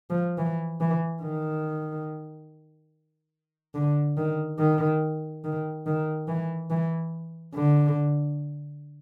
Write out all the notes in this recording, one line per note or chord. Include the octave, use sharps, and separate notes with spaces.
F3
E3
E3
D#3
D3
D#3
D#3
D#3
D#3
E3
E3
D3